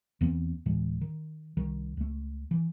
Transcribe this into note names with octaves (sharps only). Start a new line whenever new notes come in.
E2 E3 B3 C4
D1 A2 E3 G#3
D#3
C2 D#3
C#2 A3
E3